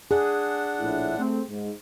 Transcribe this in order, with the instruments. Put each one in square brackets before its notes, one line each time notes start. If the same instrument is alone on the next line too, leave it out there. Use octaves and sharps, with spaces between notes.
[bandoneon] D4 F#5 [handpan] G#4
[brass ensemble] A#1 A2 E4
A3 C4
G#2